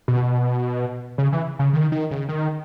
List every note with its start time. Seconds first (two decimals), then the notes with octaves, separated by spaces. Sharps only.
0.08 B2
1.18 C#3
1.32 E3
1.59 C#3
1.73 D#3
1.92 D#3
2.11 C#3
2.29 D#3